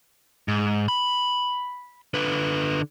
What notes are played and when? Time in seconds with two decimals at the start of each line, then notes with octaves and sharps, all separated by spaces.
0.48 G#2
0.88 B5
2.14 D3 B4